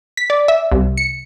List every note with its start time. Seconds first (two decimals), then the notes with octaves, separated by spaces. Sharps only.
0.17 B6
0.30 D5
0.48 E5
0.72 C2
0.97 C#7